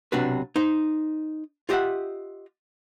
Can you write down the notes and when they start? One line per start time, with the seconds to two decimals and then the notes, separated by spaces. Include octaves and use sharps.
0.12 B1 C3 D4 F#4 B4
0.56 D#4 C5
1.69 F4 G4 D#5 E5 F#5